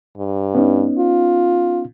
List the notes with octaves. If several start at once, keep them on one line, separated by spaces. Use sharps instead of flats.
G2
B3 C#4 D#4
F4